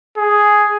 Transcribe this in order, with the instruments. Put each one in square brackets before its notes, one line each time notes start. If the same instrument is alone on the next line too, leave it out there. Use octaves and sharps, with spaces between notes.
[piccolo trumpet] G#4